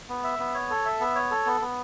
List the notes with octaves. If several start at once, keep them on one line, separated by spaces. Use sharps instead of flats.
B3
E5
B3
C#5
A4
E5
B3
C#5
A4
B3
B3